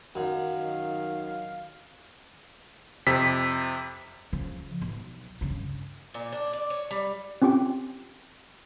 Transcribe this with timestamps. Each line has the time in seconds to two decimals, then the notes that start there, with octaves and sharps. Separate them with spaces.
0.15 F#2 D#3 F5
3.07 F2 C3 B6
4.33 C#3 F3
4.82 B1
5.41 G2 C#3
6.14 A#2
6.32 D4
6.53 D5
6.70 C#5
6.91 G3
7.42 C4 C#4 F4 G4 G5